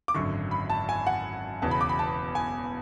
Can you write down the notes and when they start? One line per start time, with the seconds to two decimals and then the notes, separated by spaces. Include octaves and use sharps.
0.08 D6
0.14 G#1 F#2 D3 C#6
0.51 B5
0.70 A5
0.89 G#5
1.07 F#5
1.62 E1 E2 C#3 A5
1.71 B5
1.81 D6
1.89 B5
1.99 A5
2.35 G#5